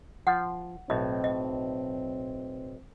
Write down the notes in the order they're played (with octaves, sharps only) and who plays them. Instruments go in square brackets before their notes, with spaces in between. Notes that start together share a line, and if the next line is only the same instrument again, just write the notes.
[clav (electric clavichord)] F3 [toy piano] F#5
[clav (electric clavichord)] B1 A2 [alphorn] C4 [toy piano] D#5
[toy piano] D#5